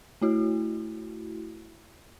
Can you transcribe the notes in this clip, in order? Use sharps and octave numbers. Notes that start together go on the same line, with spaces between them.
A3 E4 F#4